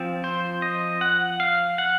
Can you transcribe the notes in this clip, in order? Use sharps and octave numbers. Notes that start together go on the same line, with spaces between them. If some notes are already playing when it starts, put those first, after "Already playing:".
Already playing: F3 C4
C5
D#5
F#5
F5
F#5